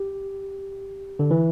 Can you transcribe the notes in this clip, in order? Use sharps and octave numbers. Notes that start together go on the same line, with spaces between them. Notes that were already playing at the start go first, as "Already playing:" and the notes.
Already playing: G4
D3
E3